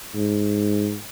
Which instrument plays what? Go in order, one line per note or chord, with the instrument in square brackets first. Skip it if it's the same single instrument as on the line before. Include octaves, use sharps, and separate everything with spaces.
[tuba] G#2